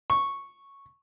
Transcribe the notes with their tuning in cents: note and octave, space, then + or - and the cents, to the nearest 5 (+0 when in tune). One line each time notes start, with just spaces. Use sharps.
C#6 -5